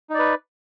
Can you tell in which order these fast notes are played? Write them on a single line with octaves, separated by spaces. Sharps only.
D#4 D5 B4